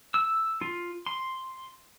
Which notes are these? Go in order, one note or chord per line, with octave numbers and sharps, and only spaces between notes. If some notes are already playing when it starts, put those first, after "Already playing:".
E6
F4
C6